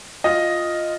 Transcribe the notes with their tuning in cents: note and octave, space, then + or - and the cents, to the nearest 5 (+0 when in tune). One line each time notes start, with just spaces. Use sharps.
F4 +0 D#5 +0